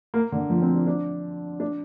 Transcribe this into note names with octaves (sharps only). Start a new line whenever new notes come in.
A#3
D3
F3
C4
D4
D4
D4